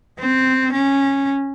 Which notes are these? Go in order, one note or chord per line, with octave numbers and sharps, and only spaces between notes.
C4
C#4